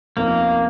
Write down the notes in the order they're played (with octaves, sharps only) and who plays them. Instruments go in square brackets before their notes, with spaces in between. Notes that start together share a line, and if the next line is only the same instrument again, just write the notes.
[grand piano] F1 F2 F3 B3 D#4 [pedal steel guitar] A#3